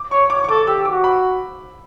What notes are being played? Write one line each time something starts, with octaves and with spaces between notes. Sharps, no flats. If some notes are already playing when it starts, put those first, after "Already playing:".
Already playing: D6
C#5 C#6
C#5 D6
C#6
A4 D6
G4 E6
F#4 D6
B5